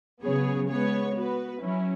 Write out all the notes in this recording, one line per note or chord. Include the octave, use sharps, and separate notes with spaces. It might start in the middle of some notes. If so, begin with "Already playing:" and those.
C#3 F#3 B3 G#4 C#5
G#3 B3 G#4 C#5
B3 F#4 B4
F#3 C#4 E4